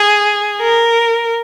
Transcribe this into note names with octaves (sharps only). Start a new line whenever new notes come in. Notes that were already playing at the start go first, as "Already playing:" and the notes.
Already playing: G#4
A#4